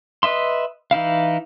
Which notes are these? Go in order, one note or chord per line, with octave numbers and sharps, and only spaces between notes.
B4 D#5 E5 C6
E3 D#4 E4 F5